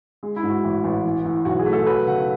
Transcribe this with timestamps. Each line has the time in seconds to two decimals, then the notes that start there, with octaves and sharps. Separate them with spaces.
0.23 G#3
0.36 E4
0.43 G#2
0.50 F#4
0.64 A1
0.84 A1
1.04 E3
1.25 A2
1.45 B1 F#4
1.59 G#4
1.66 A3
1.73 A4
1.86 F#3 B4
2.07 C#3 F#5